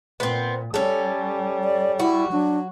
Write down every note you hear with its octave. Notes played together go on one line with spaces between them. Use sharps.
A#2 B3 C4
G3 C#4 A4
D5
E4 F#4
F#3 D4